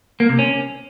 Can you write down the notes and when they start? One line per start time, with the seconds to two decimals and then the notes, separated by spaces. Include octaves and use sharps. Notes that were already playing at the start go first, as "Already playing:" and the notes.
0.20 A#3
0.29 C3
0.39 C#4